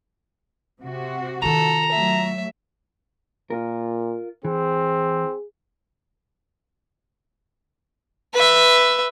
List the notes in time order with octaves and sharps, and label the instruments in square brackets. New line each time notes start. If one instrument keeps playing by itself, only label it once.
[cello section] C3 F#4
[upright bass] D#3 F4 [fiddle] A4 [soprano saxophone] A#5
[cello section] F#3 A3 [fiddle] E5
[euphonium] A#2 [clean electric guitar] F4 A#4
[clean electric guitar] E3 [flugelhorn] C4 [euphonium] G#4
[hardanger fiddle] B4 E5